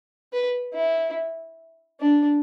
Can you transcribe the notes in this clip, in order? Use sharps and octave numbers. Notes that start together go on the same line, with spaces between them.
B4
E4
D4